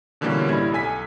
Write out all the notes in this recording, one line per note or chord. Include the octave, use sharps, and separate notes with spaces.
B2 D3 E3 G3 A#3 C#4
A1 G3 E4 G#6
B1 A4 G#5 B6